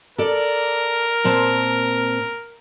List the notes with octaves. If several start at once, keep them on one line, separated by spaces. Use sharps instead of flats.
A4 A#4 D5
A#2 C4 A5